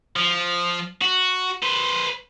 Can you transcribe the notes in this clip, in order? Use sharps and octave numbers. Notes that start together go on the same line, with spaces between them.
F3
F#4
B4 C5